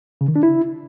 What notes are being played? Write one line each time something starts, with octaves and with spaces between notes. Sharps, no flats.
C#3
D#3
D4
E4